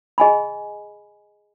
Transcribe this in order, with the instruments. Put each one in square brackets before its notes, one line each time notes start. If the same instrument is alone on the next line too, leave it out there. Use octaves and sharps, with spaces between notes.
[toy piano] G#4 D#5 G#5 B5